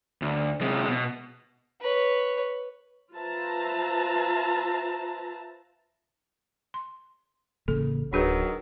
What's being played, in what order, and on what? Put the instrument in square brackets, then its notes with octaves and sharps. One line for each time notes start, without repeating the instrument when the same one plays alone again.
[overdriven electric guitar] D2
C3 G#3
B2
[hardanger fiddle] B4 C#5
[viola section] F4 B4 C5 E5 A5 A#5
[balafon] C6
[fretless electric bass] A1 C#3 A#3 [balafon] A4
[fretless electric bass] D1 [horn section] D#3 F#3 [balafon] D4 G#4 B4